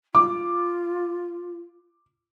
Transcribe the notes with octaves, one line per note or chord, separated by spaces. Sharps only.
F4 D6